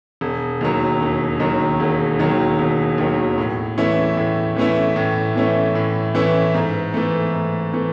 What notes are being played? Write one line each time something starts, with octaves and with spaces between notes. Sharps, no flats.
E1
D#2 D#3 F#3
E1
D#2 D#3 F#3
E1
D#2 D#3 F#3
E1
D#2 D#3 F#3
A2
E3 A3 C#4 E4
A2
E3 A3 C#4 E4
A2
E3 A3 C#4 E4
A2
E3 A3 C#4 E4
G#2
E3 A3
G#2
E3 A3